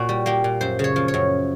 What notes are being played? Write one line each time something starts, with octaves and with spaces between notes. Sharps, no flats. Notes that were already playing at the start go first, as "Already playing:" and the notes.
Already playing: A#2 F#4
G3
A#3 G4
A#2
F#2 C5
C#3 C#5
F3
C#5
F#2